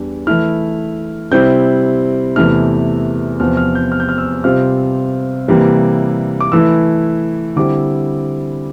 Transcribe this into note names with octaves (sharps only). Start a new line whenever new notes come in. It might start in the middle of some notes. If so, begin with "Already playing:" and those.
Already playing: E2 G3 D4
E3 A3 E4 F6
C3 G3 C4 E4 G6
E2 C3 E3 A3 E4 F6
E2 C3 F3 C4 F6
F6
G6
F6
G6
F6
E6
C3 G3 C4 F4 F6
C3 E3 G3 A#3
D6
E3 A3 E4 E6
D3 G3 C4 E4 D6